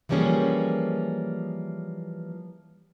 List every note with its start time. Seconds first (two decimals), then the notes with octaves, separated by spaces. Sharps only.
0.09 E3 F3 G3 A#3 C#4 G#4